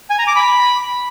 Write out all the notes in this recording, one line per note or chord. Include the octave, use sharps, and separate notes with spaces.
G#5
A#5
D6
B5